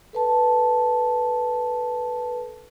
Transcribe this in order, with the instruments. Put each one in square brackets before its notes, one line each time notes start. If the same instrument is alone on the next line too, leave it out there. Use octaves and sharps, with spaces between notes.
[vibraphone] A4 B4 A5